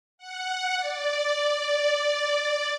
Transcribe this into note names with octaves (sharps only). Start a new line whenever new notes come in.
F#5
D5